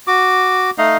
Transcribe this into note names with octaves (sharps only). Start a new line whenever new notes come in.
F#4 D6
A3 D#4 D#5 F5